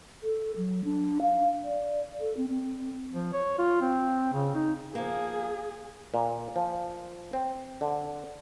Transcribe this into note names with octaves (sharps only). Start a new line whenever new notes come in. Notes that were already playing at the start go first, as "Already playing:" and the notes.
A4
F#3
D4
F5
D5
A4
C4
C4
F3
C#5
F4
C4
C#3
D#4
F3 A#3 G#4
A#2
F3
C4
D3